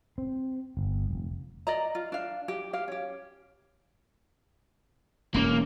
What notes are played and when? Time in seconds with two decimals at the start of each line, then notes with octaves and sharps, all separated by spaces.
0.18 C4
0.77 G1
1.11 F1
1.67 D5 D#5 A#5
1.95 F4
2.12 D4 F5
2.48 G4
2.73 G4 F5
2.88 C#4 G4
5.34 E1 A#3 C#4